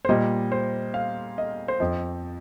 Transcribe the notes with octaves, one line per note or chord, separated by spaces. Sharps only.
C5
A#2 G3 D#5
C5
F5
D#5
C5
F2 F3 D#5